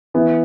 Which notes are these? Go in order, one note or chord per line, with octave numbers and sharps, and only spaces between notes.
E3 B3 E4